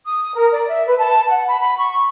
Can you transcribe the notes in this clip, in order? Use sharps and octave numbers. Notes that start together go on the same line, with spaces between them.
D#6
A#4
D5
E5
B4
A5
F#5
B5
B5
C#6